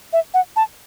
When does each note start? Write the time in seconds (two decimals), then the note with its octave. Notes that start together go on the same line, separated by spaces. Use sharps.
0.13 E5
0.34 F#5
0.56 A5